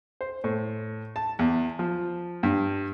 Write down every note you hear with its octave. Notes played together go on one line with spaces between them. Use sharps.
C5
A2
A5
E2
F3
G2